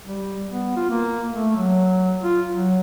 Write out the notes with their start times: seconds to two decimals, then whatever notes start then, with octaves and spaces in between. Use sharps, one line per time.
0.06 G3
0.52 B3
0.76 F4
0.91 A#3
1.33 A3
1.57 F#3
2.23 F4
2.51 F#3